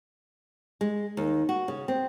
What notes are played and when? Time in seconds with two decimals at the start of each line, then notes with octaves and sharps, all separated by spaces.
0.81 G#3
1.17 D#2
1.49 F#4
1.68 C#3
1.88 C4